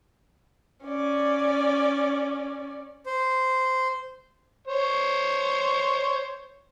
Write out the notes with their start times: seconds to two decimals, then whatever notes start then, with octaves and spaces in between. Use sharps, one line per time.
0.86 C#4 D5
3.06 C5
4.67 C5 C#5